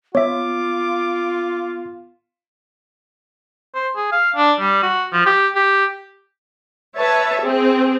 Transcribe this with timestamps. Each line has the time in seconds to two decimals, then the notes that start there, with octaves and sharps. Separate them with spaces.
0.15 B3 F4 C#5 E5 D6
3.75 C5
3.96 G#4
4.12 F5
4.36 D4
4.60 G3
4.83 F#4
5.13 F3
5.26 G4
5.56 G4
6.97 B4 C#5 E5 A5
7.41 C4 G#4